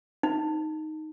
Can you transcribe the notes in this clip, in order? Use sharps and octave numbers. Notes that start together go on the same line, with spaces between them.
D#4